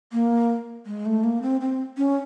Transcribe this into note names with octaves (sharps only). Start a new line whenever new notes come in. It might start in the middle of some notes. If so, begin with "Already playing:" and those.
A#3
G#3
A3
A#3
C4
C4
C#4